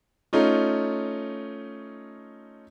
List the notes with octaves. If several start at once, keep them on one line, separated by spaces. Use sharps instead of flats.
A3 C#4 D#4 F4